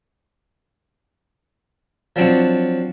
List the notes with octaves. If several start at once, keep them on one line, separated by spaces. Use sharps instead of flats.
F3 F#3 C4 D4 F#4